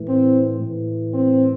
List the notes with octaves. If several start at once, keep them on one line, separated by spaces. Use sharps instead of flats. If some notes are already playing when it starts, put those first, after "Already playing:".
Already playing: A2 E3
C4
A2 E3
C4